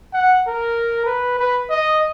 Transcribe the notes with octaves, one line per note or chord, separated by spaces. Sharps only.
F#5
A#4
B4
B4
D#5